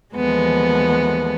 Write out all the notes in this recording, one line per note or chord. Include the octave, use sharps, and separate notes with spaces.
D#2 E3 F3 G#3 B3 A4